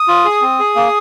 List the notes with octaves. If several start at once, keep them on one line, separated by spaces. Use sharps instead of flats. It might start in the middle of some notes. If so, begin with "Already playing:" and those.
Already playing: D#6
F4
G#4
C4
G#4
A#3